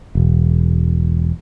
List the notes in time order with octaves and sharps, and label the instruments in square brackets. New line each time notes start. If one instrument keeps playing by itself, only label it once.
[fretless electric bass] E1